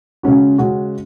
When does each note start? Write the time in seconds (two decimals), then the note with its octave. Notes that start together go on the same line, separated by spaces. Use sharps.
0.23 C#3 G#3 C#4 F#4
0.58 C#3 G#3 C#4 F#4